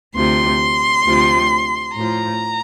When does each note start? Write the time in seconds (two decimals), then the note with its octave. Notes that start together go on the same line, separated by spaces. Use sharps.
0.15 D2 C3 F3 C6
1.06 D2 C3 F3
1.96 A2 F3 A#5